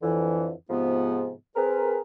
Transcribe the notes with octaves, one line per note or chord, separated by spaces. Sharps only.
F2 D3 E3
G#2 C3 F3 B3
C4 G#4 A#4 B4